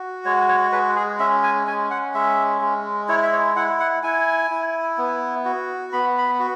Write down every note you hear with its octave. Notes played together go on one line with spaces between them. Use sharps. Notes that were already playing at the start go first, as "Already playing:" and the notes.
Already playing: F#4
G#3 C#5
C#5
G#3 B4
G#4
C#4 E5
G#5
C#4 G#5
F#5
G#3 E5
G#3
E4 C#5
E5
C#5
E4 F#5
F#5
E4 G#5
E4
B3
F#4
B3 B5
B5
F#4